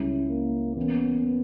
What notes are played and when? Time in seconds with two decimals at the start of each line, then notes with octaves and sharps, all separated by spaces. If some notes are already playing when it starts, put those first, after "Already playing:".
Already playing: C#2 C#3 G3 C#4 E4
0.29 A#3
0.76 E3 A#3 B3 C#4